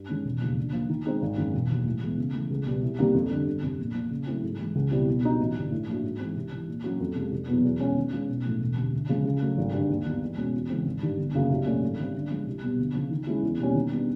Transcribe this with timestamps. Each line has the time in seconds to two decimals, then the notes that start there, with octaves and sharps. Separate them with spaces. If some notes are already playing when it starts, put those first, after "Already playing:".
Already playing: G2
0.09 D#3 G#3 C#4
0.25 E1
0.41 D#2 C#3 F3
0.57 D3
0.73 F3 A#3
0.89 D#3
1.06 G#3 C4 D#4 G#4
1.22 G#1
1.37 F#2 D#3 G#3
1.54 E1
1.70 D#2 D#3 F#3
1.86 A2
2.02 E3 G#3 B3
2.18 C#3
2.34 E3 A3
2.50 C#2
2.66 B2 G3 B3
2.82 C2
2.99 C3 D#3 G3 A#3
3.15 F2
3.30 D3 G3
3.47 G1
3.63 F2 C3
3.79 A#1
3.95 A#2 F3
4.11 C#3
4.27 F#3 A3 C4 E4
4.43 G#2
4.59 E3 G#3
4.75 C#2
4.91 B2 G3 C4 E4
5.08 B2
5.23 G3 B3 D#4 F#4
5.39 A1
5.55 G2 D3
5.71 A2
5.88 F3 A#3 D4 F#4
6.03 G#2
6.20 E3 G#3 C4
6.36 C2
6.52 C3 E3
6.68 A#2
6.84 F#3 A#3 C#4 F#4
7.00 F2
7.16 C3 F3 G#3
7.32 F1
7.48 E2 B2 F#3 B3
7.64 E2
7.80 B2 G#3 C#4 F4
7.97 D#3
8.12 G#3 C#4 F4
8.29 B1
8.45 A2 F3 A3
8.61 E1
8.77 D2 C3
8.93 D2
9.09 C#3 F3 G#3
9.25 C#3
9.42 F#3 A3
9.58 G#1
9.73 G2 D3
9.90 D#2
10.06 D#3 G3 B3 D#4
10.22 E2
10.37 B2 G#3 C#4 F#4
10.54 E2
10.70 C#3 E3 G#3 C4
10.86 G#1
11.02 G2 D#3 G3
11.18 G1
11.34 F#2 C#3 F#3 A#3
11.50 C2
11.66 A#2 F#3 A3 C#4
11.82 G#2
11.98 D#3 G3 C4
12.14 D3
12.31 F3 G#3
12.47 C2
12.63 B2 G3 B3
12.79 D2
12.95 C#3 F3
13.11 D#3
13.27 G#3 C#4 E4
13.43 E2
13.59 B2 G3 A#3 C#4
13.75 D#3
13.91 G3 B3 D4